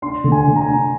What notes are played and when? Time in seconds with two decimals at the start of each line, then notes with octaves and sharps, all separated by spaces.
0.02 D4 C6
0.24 D3
0.32 G#5
0.47 D3
0.56 A#5
0.61 G#5
0.70 D4